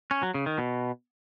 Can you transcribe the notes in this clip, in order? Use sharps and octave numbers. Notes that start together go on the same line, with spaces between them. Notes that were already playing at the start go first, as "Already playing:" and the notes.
C#4
F#3
C#3
D#3
B2